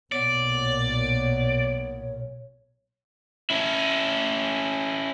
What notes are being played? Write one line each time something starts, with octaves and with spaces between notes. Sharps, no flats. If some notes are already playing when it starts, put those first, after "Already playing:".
B1 A#2 B3 C#5 D5
C#4 E4